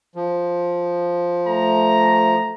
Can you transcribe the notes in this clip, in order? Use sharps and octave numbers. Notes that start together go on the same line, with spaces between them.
F3
A3 A#5